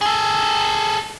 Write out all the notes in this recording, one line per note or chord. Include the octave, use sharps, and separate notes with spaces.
G#4 A4